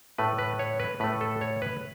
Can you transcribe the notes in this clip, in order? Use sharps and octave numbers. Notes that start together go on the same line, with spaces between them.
A2 A3 B4
B4
C#5
B4
A2 A3 B4
A4
C#5
B4